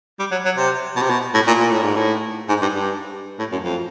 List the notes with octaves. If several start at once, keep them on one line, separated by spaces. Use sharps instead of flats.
G3
F#3
F#3
C3
B2
C3
B2
A2
A#2
A#2
A2
G#2
A2
G#2
G2
G2
A2
F#2
F2